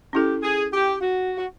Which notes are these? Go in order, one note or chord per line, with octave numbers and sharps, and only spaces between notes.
C#4 E4 G4 A4
G#4
G4
F#4
F#4